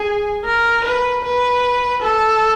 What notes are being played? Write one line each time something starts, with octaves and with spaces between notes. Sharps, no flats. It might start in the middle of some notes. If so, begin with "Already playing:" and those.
Already playing: G#4
A#4
B4
B4
A4